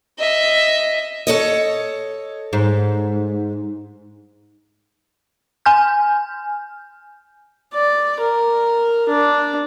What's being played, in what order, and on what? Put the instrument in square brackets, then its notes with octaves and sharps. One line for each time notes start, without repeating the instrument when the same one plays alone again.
[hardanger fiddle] D#5 E5
[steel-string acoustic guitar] A4 C#5 D#5
[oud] G#2
[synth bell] G#5 F6 G6
[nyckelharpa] D5
A#4
D4